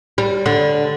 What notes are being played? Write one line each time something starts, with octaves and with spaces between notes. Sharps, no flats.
G3
D3